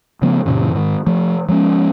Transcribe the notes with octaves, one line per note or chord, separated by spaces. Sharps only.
C#3 F3 A3 B3
F#2 A#2 C#3 E3
G#2 D#3
F3 A3
F3 G#3 C4 C#4